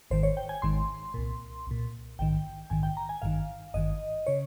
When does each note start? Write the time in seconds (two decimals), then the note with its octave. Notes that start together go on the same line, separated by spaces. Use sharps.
0.11 G#1 G#2 D#3 C5
0.23 C#5
0.37 G5
0.49 G#5
0.62 G#1 G#2 D#3 C6
1.14 C2 A#2
1.67 C2 A#2
2.19 A#1 G#2 D#3 G5
2.70 A#1 G#2 D#3 G#5
2.83 G5
2.97 A#5
3.09 G#5
3.22 G#1 G2 D#3 F5
3.74 G#1 G2 D#3 D#5
4.27 C#3 C#5